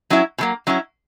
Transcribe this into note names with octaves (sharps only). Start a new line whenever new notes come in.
F#3 C#4 E4
B2 F#3 A#3
F#3 C#4 E4